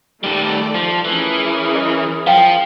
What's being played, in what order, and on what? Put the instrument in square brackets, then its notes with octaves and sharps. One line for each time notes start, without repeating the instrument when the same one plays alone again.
[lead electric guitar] D#3 G3 [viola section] A3 D5
[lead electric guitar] F3
[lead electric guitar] E3 [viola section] C#4 G#4 A#4
[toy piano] D#5
[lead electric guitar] F3 [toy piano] F5 G5